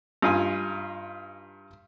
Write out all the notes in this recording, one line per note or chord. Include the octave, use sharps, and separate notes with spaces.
G2 D#4 F4 G#5